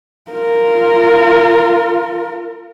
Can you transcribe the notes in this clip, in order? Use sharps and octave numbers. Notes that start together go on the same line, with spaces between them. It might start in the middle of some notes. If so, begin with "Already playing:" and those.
F4 A#4